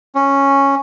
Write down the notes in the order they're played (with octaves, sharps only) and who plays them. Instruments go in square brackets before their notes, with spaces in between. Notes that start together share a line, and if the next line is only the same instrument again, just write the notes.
[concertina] C#4